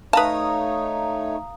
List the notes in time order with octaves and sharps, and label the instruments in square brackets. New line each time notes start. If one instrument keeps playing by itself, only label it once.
[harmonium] A3 D#4 C#5 [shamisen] B4 A5 [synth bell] F5 A#5 D#6